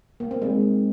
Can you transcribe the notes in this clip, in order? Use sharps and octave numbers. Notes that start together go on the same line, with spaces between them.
A#3
C4
G#3